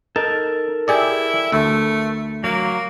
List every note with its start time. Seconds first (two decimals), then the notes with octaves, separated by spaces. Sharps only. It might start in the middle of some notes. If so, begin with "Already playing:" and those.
0.16 D#4 A4 A#4
0.88 E4 G4 G#4 D5
1.52 D2 A3
2.44 F#3 A#3